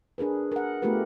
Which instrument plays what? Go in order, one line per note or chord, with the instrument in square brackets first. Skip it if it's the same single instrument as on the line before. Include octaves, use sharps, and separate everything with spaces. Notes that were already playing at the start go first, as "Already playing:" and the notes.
[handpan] D4 G#4 A#4 B4
A#4 F#5
A3 B3 F4 G4 A#4 B4